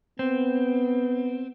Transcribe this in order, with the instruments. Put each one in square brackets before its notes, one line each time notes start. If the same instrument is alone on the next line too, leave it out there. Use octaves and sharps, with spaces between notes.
[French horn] B3 [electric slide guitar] C4